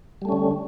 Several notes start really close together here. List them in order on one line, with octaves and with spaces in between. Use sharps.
G3 A3 C#4 D3